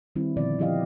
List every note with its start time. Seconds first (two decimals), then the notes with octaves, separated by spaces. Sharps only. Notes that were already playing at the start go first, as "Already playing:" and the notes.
0.16 D#3 G3 C4 E4
0.37 A#2 D3 F3 B3 D5
0.59 F3 E4 G4 D#5 F5